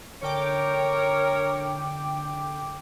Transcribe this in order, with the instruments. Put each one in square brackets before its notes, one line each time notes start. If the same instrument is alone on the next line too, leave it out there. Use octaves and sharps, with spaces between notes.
[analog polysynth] D3 G5 D6 [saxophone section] A#4 C#5